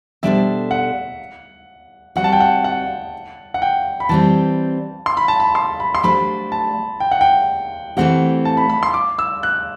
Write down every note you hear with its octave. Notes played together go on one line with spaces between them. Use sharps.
B2 G3 D4 A4 C5 E5
F#5
G3 C4 F#4 F#5
A5
G5
F#5
F#5
F#5
G5
B5
E3 G3 C4 A5
C6
B5
A5
B5
C6
B5
C6
F#3 A3 D4 G4 C5 B5
A5
G5
F#5
G5
E3 A3 C4 G4 F#5
A5
B5
B5
C6
D6
E6
F#6